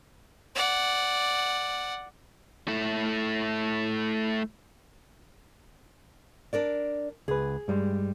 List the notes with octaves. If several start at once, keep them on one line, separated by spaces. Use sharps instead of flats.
D5 F#5
A3 E4
D4 A#4 D5
C#2 G#4 B4
G2 G3 G#3